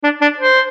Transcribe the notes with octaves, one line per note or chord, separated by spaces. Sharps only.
D4
D4
C5